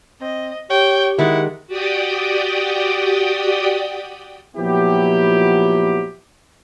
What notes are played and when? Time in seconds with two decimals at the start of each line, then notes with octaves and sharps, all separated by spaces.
0.21 C4 D#5
0.70 G4 C#5 G5
1.19 D#3 G#3 E4 D5 F#5
1.67 F#4 G4 D5 G5 D#6
4.56 A#2 F3 F#3 B3 E4 G4